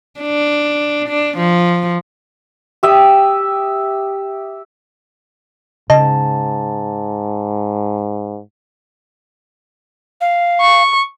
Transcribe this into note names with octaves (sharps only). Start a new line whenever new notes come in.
D4
D4
F3
G4 E5 D#6
G#2 C#3 D#5 A5
F5
C#6